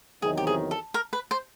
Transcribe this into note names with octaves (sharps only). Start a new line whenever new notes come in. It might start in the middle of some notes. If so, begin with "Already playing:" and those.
E2 C3 D#3 F#3 G#4
G4
G#4
A4
A#4
B4
C5